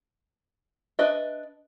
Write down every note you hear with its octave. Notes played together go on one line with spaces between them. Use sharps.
D4 B4 D#5 E5